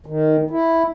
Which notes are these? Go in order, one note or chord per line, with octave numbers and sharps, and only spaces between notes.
D#3
E4